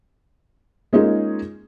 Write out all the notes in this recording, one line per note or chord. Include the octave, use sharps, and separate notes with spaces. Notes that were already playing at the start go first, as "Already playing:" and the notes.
G#3 A#3 C#4 D#4 F4 G#4